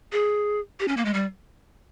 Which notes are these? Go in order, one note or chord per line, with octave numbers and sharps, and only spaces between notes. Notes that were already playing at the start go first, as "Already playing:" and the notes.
G#4
G4
C#4
A#3
G#3
G3